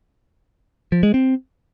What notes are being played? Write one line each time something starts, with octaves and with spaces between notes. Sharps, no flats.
F3
G#3
C4